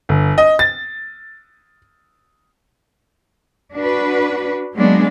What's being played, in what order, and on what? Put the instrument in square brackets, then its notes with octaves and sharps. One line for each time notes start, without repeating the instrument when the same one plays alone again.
[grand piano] G1
D#5
A6
[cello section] D4 F#4 B4
F#3 G#3 A#3 B3 D4